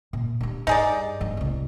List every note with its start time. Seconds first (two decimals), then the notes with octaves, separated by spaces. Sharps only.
0.13 A#2
0.41 G3 D4
0.67 G2 D#4 G#4 D5
1.20 G2 F3
1.37 C2 F4